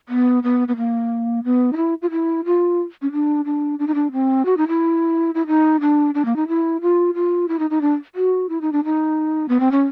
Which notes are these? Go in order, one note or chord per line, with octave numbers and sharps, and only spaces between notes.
B3
B3
B3
A#3
B3
D#4
E4
F4
E4
F4
C#4
D4
D4
D4
D#4
D4
C4
F#4
D#4
E4
E4
D#4
D4
D4
A#3
D#4
E4
F4
F4
E4
D#4
D#4
D4
F#4
E4
D#4
D4
D#4
B3
C4
C#4